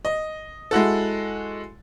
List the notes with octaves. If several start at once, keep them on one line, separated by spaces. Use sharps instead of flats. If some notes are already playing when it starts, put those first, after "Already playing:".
D#5
G#3 E4 F#4 A4